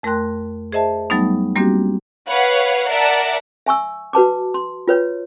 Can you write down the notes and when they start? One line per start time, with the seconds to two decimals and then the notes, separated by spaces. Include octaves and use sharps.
0.03 F2 A3 A#4 G5 C6 F#6
0.72 G#4 C5 D#5 E5 A5
1.10 F#3 G3 A3 B3 D#4
1.55 G3 A#3 C4 D4 F#4 G4
2.27 B4 C#5 F5 F#5
2.88 A#4 D5 E5 F#5 A5
3.66 E5 G#5 C#6 E6
4.13 F#4 B4 A5 D6
4.54 C6
4.88 F4 B4 C#5